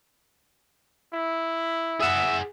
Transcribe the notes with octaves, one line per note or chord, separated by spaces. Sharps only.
E4
G#4 E5 F#5